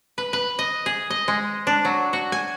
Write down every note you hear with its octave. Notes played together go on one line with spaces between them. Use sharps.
B4
B4
D#5
G#4
D#5
G#3
D4
F#3
F#4
G#5